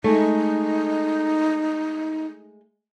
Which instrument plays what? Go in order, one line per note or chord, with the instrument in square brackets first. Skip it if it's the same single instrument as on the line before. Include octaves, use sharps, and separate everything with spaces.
[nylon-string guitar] G#3 A3 [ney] D#4